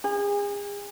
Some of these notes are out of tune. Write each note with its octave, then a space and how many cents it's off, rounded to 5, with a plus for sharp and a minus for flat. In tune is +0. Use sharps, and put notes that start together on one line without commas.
G#4 -35